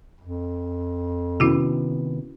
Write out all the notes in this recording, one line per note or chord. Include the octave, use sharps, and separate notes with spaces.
F2
C3 D#3 B3 C#4 E4 F#4